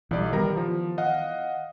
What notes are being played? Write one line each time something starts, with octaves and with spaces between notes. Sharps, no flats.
B1 E3 G3 D5
D#3 E3 G3 B3 A#4 A#5
F3
D#5 F5 F#5